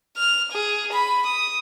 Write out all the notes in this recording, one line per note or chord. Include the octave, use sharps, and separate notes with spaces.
F6
G#4
B5
D#6